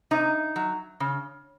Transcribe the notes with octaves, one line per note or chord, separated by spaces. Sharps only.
C3 D#4
F#3
C#3